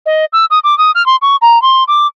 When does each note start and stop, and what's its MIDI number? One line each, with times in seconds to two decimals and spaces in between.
0.06 0.25 75
0.33 0.45 88
0.51 0.59 87
0.64 0.77 86
0.78 0.91 87
0.95 1.05 89
1.06 1.16 84
1.22 1.36 85
1.42 1.61 82
1.62 1.84 84
1.88 2.07 86